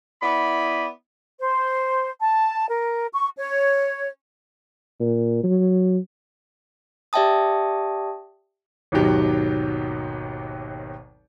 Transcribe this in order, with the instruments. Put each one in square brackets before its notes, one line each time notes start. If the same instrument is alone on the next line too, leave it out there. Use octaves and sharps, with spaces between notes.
[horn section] B3 E4 D5 B5
[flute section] C5
A5
A#4
C#6
C#5
[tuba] A#2
F#3
[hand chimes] G4 D5 E5 G5 A5 D#6
[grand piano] G#1 D#2 B2 D#3 F#3 G4